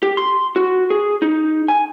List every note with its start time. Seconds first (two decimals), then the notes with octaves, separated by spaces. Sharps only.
0.03 G4
0.17 C6
0.56 F#4
0.90 G#4
1.22 D#4
1.68 G#5